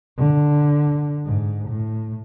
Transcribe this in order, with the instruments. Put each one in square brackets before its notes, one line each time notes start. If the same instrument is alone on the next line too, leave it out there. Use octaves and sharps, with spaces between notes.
[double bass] D3
G#2
A2